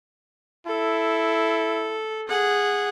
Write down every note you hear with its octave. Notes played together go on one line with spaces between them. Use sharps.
E4 A4
G#4 F#5